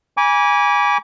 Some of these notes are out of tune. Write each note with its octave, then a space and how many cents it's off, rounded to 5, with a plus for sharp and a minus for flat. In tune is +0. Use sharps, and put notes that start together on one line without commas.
G#5 -15 B5 -40 D6 -30